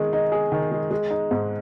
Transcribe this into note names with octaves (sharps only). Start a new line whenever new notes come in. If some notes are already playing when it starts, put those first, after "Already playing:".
Already playing: D#3 G#3 G#4
D#4
G#4
D#3
G#3
G#3
D#4
G#2